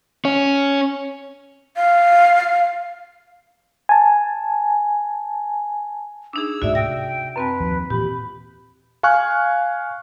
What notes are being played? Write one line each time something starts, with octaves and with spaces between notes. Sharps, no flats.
C#4 C#5
F5
G#5 A5
D4 D#4 G#4 E6
D2 G#2 A3 F#4 D5 E5
C3 G5 A#6
F#2 C4 B4 A5
D#2 F3
A#2 E3 G4 B5
F5 G#5 C#6 F6 F#6